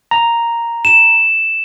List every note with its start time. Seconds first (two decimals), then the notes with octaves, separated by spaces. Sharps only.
0.11 A#5
0.85 E7